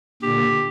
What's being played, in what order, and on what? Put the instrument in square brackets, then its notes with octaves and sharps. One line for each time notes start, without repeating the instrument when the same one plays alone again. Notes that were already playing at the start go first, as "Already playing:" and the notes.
[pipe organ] A#2 D3 [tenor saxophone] G4